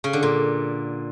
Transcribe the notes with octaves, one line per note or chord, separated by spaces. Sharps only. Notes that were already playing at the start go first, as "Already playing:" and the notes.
C#3
D3
A#2